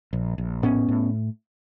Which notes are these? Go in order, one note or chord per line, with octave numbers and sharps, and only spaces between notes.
A#1
A#1
A2 B3 C#4
A2